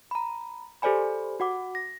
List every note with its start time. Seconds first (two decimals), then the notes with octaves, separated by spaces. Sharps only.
0.11 A#5 B5
0.82 G4 A4 C5 D5 G#5 B5
1.40 F#4 F#5 D6
1.75 A#6